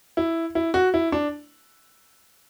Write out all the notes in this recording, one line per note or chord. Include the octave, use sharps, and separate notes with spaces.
E4
E4
F#4
E4
D4